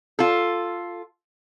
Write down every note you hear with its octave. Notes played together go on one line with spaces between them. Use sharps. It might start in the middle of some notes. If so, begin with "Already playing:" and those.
F4 A4